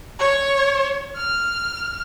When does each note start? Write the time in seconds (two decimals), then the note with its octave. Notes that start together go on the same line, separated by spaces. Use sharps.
0.19 C#5
1.16 F6